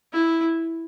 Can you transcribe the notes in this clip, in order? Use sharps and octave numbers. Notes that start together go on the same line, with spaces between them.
E4